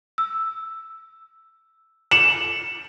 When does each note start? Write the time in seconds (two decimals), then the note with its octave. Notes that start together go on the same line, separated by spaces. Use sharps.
0.18 E6
2.11 C#7 E7 F#7